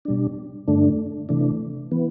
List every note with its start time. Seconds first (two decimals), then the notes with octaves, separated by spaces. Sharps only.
0.05 B2 G3 D4
0.68 G2 D3 A3 D4
1.29 C3 E3 A3 D4
1.91 E3 B3